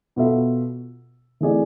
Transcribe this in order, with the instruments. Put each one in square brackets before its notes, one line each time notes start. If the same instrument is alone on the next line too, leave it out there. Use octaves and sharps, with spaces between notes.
[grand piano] B2 B3 F4 A4 E5
E3 A3 C4 G#4 D5